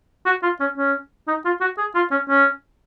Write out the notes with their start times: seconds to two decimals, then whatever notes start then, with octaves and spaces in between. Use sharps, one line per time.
0.26 F#4
0.43 F4
0.60 C#4
0.77 C#4
1.27 D#4
1.45 F4
1.61 F#4
1.78 G#4
1.95 F4
2.11 C#4
2.29 C#4